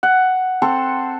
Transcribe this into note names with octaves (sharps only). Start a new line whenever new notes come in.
F#5
C4 A4 C5